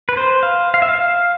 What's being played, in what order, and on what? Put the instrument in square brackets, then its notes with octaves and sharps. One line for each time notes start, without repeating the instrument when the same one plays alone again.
[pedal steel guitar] B4
C5
F5
F5
E5
F5